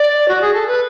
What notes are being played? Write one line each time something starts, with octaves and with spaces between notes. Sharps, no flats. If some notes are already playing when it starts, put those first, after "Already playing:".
Already playing: D5
F#4
G#4
A4
B4